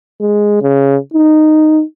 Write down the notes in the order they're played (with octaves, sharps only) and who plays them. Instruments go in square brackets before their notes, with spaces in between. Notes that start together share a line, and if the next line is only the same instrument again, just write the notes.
[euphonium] G#3
C#3
D#4